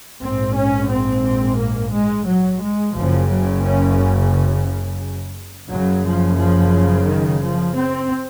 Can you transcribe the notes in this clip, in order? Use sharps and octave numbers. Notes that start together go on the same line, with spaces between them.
A#1 G#2 C4
C#4
C4
A#3
G#3
F#3
G#3
F#1 F#2 C#3 F3
F#3
C#4
F#1 F#2 C#3 F#3
F3
F3
D#3
F3
C4